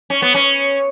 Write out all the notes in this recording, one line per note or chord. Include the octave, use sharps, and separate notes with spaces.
C#4
B3
C#4